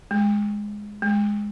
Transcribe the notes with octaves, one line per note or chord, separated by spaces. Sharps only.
G#3
G#3